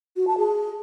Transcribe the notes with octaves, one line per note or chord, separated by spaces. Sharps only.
F#4
A5
G#4